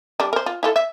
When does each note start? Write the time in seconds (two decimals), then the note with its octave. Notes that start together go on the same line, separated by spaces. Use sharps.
0.20 G3 D4
0.33 A#4 C5
0.46 F4
0.63 E4 F4 A4
0.76 E5